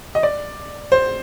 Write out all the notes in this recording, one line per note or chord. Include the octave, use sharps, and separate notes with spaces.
D#5
D5
C5